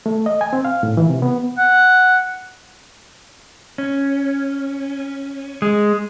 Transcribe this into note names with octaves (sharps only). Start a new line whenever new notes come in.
A3
D#5
G#5
C4
F5
A2
E3
C3
B3
F#5
C#4
G#3